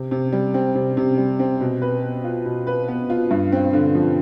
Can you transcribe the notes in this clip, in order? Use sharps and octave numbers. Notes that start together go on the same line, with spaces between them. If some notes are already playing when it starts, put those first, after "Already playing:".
Already playing: C3
C3
G3
C4
C3
C3
G3
C4
B2
B4
B3
F4
B2
B4
B3
F4
G2
C4
D3
F3